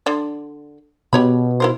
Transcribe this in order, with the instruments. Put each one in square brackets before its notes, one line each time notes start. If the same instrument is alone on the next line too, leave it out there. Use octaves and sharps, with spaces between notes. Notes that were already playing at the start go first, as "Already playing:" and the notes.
[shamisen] D3 D5
[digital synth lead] B2 [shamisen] G4 C#5 B5
[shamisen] E4 A#4 C5